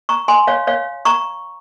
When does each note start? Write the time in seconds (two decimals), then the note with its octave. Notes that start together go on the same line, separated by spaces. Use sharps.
0.09 A#5 C#6
0.28 G#5 C6
0.47 C#5 F5
0.67 C#5 F5
1.05 A#5 C#6